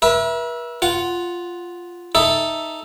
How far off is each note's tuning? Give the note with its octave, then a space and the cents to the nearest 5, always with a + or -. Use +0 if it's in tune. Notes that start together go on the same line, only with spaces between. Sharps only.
B4 -45 E5 +0
F4 +0 F#5 +0
D#4 +0 A4 +0 E5 +5